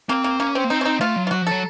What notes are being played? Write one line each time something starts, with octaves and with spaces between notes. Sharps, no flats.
A#3 C4
A#3
A#3 C#4
C4
A#3
C4 D#4
C#4
D#4
A3 F4
F#3
F4
F#3 F#4
F3
F#3 A4